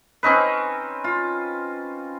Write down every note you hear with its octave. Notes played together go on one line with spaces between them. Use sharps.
C4 C#4 D#4 B4
F4